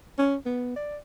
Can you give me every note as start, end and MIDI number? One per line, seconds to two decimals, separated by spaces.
0.18 0.36 61
0.46 0.71 59
0.76 0.97 74